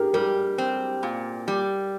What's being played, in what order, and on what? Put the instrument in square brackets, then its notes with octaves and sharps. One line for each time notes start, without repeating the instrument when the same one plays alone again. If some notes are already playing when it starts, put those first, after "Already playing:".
Already playing: [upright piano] G4 G#4 A#4
[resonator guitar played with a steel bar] G3 [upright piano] G4 A#4
[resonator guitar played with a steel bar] C4
A#2
G3